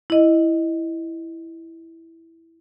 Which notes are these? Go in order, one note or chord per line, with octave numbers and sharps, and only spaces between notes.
E4 D#5